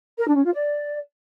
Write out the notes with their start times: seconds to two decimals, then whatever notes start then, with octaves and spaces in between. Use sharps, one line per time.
0.18 A#4
0.27 D4
0.35 C#4
0.44 F4
0.53 D5